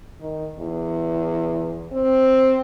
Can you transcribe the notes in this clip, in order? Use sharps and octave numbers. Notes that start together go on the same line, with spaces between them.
D#3
E2
C4